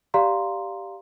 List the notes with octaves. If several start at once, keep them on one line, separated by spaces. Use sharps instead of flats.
G4 D5 F5 A#5 C6